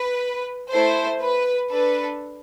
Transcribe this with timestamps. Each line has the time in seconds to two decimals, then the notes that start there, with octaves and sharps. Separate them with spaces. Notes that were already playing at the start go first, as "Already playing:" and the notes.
Already playing: B4
0.72 A3 E4 A4 C5
1.21 B4
1.70 D4 A4 B4